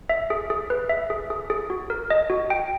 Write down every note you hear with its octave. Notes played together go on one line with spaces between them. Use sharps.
E5
G#4
G#4
B4
E5
G#4
G#4
G#4
F#4
A#4
D#5
F#4
G5